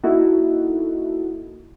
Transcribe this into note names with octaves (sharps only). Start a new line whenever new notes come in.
A#3 D#4 E4 F#4 A4